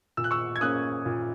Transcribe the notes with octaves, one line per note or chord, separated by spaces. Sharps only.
A#2 E6
F#6
C#6 E6
G#6
A#3 C#4 D#6 F#6
A#2